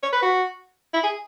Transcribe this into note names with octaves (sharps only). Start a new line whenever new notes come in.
C#5
B4
F#4
E4
G#4